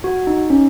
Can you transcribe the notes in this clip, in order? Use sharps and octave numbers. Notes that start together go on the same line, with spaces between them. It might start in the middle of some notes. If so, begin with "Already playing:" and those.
F#4
D#4
C#4